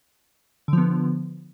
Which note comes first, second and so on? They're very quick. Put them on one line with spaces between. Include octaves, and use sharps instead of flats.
D3 F3 B3